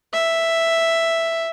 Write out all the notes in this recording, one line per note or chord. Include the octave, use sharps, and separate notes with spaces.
E5